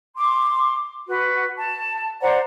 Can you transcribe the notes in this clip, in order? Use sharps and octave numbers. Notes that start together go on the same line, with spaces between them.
C6 D6
F#4 B4
A5
C5 D5 F#5 A#5